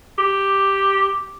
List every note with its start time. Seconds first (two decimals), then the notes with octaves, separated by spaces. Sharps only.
0.18 G4